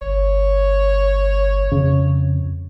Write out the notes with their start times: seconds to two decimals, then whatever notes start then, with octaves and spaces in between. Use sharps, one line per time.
0.01 G1 C#5
1.72 F2 C#3